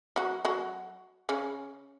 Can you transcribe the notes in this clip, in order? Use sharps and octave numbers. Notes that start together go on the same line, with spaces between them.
F#3 F#4
F#3 F#4
C#3 C#4